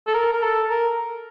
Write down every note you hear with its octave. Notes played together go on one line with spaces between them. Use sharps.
A4
A#4
A#4
A4
A#4